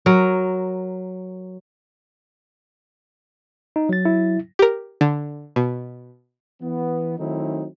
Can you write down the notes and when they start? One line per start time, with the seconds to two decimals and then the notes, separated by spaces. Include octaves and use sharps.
0.06 F#3 A#4
3.76 D#4
3.89 F#3 A6
4.05 E4
4.59 G4 A#4
5.01 D3
5.56 B2
6.61 E3 B3
7.19 D#3 F#3 A3 C4 D#4 E4